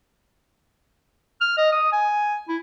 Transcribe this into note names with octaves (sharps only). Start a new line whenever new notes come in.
F6
D#5
D#6
G#5
E4